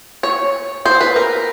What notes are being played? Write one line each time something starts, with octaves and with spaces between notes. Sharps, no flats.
C#5
C5
B4
A#4